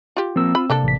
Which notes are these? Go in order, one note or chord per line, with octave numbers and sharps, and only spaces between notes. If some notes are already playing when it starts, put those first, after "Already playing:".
F4 G4
F3 A#3 C4 A#4 E6
F4 B5
C3 A#3 D4 A4
A1 B6